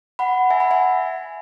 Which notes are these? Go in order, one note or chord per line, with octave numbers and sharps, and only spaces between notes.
F#5 B5
E5 G#5
F#5 B5
E5 G#5